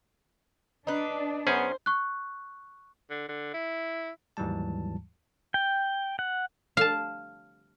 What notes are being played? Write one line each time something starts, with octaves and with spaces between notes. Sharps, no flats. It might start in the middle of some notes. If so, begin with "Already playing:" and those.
D4 D#4 B4
F#2 B3 C#4 G#4 C5
C#6 F#6
D3
D3
E4
D#2 G#2 E3 F#3 G3 A5
G5
F#5
F5 A5